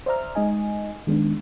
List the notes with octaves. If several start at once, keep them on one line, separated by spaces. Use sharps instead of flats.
C5 D5 E5 A#5 F6
G#3 D#4 D#5 G#5
D#3 G#3 B3 D4